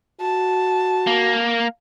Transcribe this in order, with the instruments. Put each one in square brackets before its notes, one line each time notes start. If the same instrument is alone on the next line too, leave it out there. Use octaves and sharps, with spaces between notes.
[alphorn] F#4 [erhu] A5
[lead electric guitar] A#3